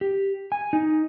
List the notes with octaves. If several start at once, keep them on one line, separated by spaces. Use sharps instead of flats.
G4
G#5
D#4